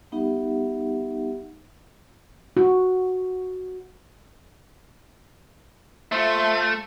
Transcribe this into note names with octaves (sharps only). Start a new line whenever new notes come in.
G3 B3 D#4 G4 E5 F#5
F#4
A3 F4 C5 E5